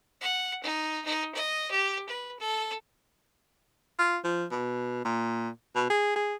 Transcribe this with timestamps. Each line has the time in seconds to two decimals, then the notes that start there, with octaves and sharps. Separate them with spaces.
0.21 F#5
0.63 D#4
1.05 D#4
1.35 D#5
1.71 G4
2.09 B4
2.39 A4
3.99 F4
4.24 F3
4.51 B2
5.05 A#2
5.75 B2
5.90 G#4
6.16 G#4